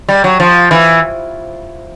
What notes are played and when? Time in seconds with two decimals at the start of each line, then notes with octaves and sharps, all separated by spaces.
0.09 G3
0.24 F#3
0.40 F3
0.71 E3